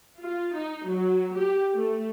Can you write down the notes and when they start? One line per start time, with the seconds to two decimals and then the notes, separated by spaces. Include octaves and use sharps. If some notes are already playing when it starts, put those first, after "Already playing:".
0.21 F4
0.54 D#4
0.87 F#3
1.36 G4
1.74 A3